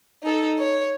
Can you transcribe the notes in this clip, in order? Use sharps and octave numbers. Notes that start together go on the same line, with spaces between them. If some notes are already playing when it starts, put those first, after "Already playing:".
D#4 A4
C#5